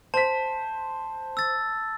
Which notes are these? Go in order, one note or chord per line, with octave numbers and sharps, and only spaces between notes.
C5 A5 B6
E6 A6